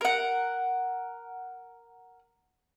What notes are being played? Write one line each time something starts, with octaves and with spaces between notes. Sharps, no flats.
A#4 F#5